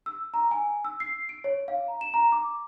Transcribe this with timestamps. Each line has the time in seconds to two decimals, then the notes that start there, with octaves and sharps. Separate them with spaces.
0.06 E6
0.34 A#5
0.51 G#5
0.85 E6
1.00 C7
1.29 D7
1.44 C#5
1.68 F5
1.88 A#5
2.01 E7
2.14 A#5
2.32 D6